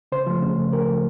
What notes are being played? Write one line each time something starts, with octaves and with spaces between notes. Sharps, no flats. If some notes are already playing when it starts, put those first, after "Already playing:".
C#3 C5
F3 A3
C#3
F3 A3
C#3 A#4
F3 A3